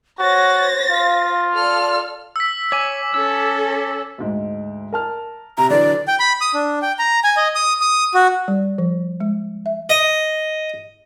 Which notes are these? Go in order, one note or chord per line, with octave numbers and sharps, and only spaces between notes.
F#4 C5 C#5 A6 A#6
F4 F5
A4 D5 F6
E6 B6
C#5 G#5 D6
C#4 A4 E6
D2 G#2
A#4 A5 F6
C3 A#5
D3 E3 F#3 D5
G5
B5
D#6
D4
G5
A#5
G#5
D#5
D#6
D#6
F#4
G3
F3
G#3
E5
D#5